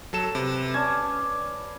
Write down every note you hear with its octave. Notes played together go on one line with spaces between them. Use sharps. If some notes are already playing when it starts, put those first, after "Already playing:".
F#3 A4 E7
C3 B4
C#4 D5 A5 G#6